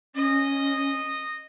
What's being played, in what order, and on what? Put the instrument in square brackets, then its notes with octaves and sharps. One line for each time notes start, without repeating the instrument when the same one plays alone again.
[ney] C#4 [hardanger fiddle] D#5